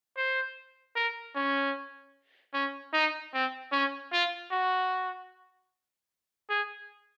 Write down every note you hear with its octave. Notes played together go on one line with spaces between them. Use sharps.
C5
A#4
C#4
C#4
D#4
C4
C#4
F4
F#4
G#4